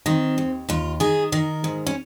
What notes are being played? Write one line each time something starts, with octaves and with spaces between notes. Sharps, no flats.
D#3 C4
D#2
D#2 F4
D#3 G#4
D#3 A#4
G#2
C#4